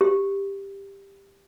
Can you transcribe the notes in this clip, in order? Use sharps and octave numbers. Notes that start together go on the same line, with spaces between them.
G4